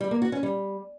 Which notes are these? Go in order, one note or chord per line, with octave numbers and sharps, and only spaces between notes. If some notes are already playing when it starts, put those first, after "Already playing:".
G3
A#3
F#4
C#4
G3